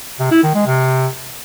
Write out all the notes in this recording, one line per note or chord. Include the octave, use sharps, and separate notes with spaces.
C3
E4
D#3
G#3
C3